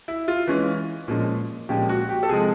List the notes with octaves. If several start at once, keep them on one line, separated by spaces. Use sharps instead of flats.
E4
F4
E3 G#3 C#4
A#2 F3 G#3 C#4
A#2 F3 G#3 C#4 G4
F#4
G4
A4
C3 F3 G#3 G#4